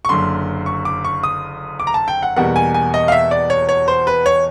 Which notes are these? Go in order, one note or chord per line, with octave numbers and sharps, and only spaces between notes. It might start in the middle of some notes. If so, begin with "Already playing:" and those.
C#6
F#1 F#2 D3 C6
C#6
D6
C#6
D#6
D6
A#5
A5
G5
F#5
E2 B2 G3 A#3 F#5
G#5
G#5
D#5
F5
E5
D5
C#5
C#5
C5
B4
C#5